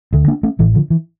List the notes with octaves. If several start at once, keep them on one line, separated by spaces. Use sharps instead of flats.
D2 D3
A#3 D4
A3 C#4
A1 A2 E3
D3 F3
E3